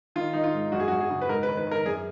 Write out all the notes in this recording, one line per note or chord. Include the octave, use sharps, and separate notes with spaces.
D#3 F4
D#3 D#4
F4
G#2
F#2 F#4
G#4
F#4
F#2
G#4
C#3
B4
G#2 A#4
B4
D#3
B4
D#3 A#4
F#2 G#4